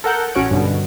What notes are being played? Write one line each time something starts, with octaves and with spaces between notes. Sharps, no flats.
A4 A#4 F#5 G6
A1 C#4 F#4 C#5 F#6 D7
G2 B2 D3